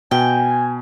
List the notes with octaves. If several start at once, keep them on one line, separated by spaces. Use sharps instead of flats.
B2 G5 G#5